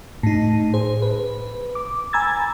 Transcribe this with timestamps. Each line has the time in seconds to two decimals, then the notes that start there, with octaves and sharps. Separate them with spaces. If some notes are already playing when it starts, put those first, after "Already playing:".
0.23 A2 D#4
0.74 G#4 C5
1.02 B4
1.75 D6
2.13 G#5 A#5 B5 E6 G#6 A6